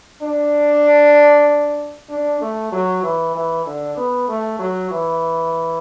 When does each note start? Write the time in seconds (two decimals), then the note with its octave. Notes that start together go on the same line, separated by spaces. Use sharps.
0.22 D4
2.10 D4
2.41 A3
2.72 F#3
3.03 E3
3.35 E3
3.66 D3
3.97 B3
4.29 A3
4.59 F#3
4.91 E3